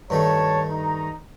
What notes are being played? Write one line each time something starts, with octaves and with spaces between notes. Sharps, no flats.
G2 D#3 A3 C#5 A5
D#4 A#5